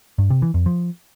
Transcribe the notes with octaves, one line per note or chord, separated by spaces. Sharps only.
G2
C3
E3
F2
F3